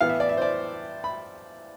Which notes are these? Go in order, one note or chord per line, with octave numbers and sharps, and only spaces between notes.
A2 E3 B3 F5
E5
D5
E5
C5
D5
B5